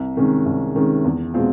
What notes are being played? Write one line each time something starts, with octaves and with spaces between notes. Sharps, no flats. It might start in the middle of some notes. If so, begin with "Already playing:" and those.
Already playing: C2
C3 D#3 G#3 C#4
C2
C3 D#3 G#3 C#4
E2
B2 G#3 C4 F4